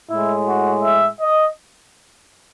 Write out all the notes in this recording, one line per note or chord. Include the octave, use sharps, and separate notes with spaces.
A2 G#3 E4
F#4
E5
D#5